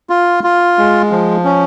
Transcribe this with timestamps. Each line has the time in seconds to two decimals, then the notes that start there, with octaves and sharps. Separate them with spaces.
0.10 F4
0.44 F4
0.78 G#3
1.11 F3
1.45 C#4